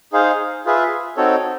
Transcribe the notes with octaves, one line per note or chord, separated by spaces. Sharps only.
D#4 G#4 C5 F5
F4 G#4 B4 E5
C4 D#4 F#4 A4 C#5